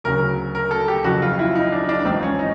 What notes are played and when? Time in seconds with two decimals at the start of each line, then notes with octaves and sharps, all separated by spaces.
0.04 D2 C#3 F#3 A#4
0.55 A#4
0.71 A4
0.88 G4
1.04 F#1 F2 C#3 F3 F#4
1.22 F4
1.39 E4
1.55 D#4
1.72 D4
1.89 D4
2.05 A1 G#2 F3 C4
2.23 C#4
2.39 D#4